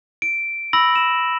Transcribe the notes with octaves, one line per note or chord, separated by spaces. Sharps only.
D7
B5 E6 A#6 F#7
E7